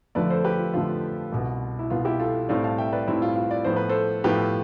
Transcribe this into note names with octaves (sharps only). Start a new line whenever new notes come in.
F2 D3 F3 A3 B4 D5
A4 C5
G4 B4
F4
F2 D3 F3 A3 F4
C2 B2 B3
E4
C2 B2 B3 F4
E4 G4
F4 A4
A2 G3 C4 D5 F5
F5 A5
E5 G5
B4 D5
A2 G3 C4 E4
F4
F4
D5
A2 F3 B3 C5
B4
A4 C5
A2 F3 B3 G4 B4